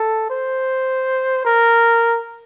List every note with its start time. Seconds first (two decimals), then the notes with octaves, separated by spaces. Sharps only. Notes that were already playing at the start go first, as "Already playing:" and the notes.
Already playing: A4
0.30 C5
1.45 A#4